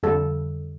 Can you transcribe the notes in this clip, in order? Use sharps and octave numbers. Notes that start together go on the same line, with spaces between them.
F2 D3 G3 A4